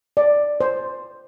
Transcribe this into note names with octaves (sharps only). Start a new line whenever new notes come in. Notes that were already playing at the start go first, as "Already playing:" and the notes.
D5
C5